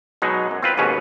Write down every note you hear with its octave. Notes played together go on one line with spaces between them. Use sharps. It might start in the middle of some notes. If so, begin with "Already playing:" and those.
B2 F#3 G#3 D#4
F#2
C4 F4 B4
D#2 G#2 B2 C#4 B4